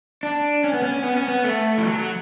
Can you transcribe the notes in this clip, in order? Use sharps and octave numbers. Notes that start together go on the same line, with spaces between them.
D4
C#4
B3
C#4
B3
C#4
B3
A3
E3
F#3
F#3